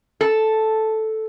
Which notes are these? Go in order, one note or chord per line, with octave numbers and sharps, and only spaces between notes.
A4